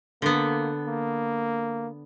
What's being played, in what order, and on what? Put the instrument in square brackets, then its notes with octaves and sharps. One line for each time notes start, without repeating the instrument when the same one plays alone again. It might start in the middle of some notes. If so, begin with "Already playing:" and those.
[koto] D3 B3 [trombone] A#3
[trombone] A#3